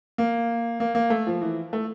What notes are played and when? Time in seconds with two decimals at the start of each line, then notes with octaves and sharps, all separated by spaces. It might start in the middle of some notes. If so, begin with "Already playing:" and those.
0.18 A#3
0.80 A#3
0.95 A#3
1.10 A3
1.27 F3
1.41 E3
1.73 A3